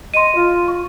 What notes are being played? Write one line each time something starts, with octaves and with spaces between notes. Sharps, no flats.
D#5 C6 D#7
F4
C#6